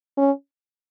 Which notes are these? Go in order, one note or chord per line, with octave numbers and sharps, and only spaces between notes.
C#4